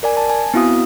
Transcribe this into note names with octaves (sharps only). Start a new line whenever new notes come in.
A#4 D5 G#5
A5
G#5
B3 C4 E4 F#4 F5 D#6